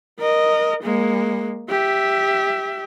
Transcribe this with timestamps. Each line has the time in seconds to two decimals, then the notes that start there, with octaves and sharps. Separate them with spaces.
0.19 A#4 D#5
0.83 G#3 A#3
1.69 G4 E5